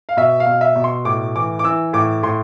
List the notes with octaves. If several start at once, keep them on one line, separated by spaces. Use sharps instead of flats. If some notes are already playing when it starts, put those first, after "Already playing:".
F5
B2 E5
F5
B2
E5
B2
C6
A2 D6
E3 D6
D6
E3 E6
A2 D6
A2 C6